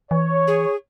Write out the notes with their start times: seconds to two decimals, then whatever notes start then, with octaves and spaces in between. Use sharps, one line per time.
0.11 E3 C#5
0.47 G#4